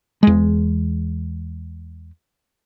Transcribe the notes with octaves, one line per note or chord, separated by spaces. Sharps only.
E2 G#3